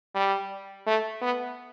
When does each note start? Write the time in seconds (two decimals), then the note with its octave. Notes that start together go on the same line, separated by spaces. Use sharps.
0.15 G3
0.87 A3
1.22 B3